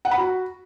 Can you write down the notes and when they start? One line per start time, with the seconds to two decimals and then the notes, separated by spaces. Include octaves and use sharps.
0.05 F#5
0.11 B5
0.18 F#4